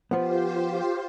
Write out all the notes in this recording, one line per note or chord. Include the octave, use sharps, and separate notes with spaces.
F3 B3 F4 G4 C5